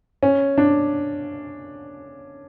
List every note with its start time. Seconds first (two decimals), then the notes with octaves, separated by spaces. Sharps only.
0.23 C#4
0.58 D4